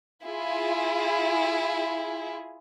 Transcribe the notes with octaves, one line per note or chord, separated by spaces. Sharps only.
E4 F4 G#4